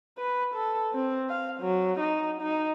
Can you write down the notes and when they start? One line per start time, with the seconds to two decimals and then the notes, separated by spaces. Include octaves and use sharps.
0.18 B4
0.54 A4
0.93 C4
1.29 F5
1.61 F#3
2.00 D#4
2.41 D#4